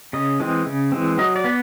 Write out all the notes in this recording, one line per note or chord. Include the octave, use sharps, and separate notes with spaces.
C#3 D#5
E3 G#3 C4
C#3
E3 G#3 C4
F#3 D#5
D5
B3